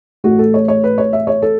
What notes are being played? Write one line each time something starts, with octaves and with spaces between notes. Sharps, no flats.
A1 A2 A3 F#4
A4
C#5
C#5
B4
C#5
E5
C#5
A4